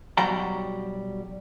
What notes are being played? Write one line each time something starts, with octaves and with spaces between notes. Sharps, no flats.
B1 F#3 G3 F#5 G5 A#5